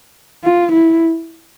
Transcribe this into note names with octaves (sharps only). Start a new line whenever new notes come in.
F4
E4